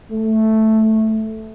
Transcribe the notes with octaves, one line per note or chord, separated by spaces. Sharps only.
A3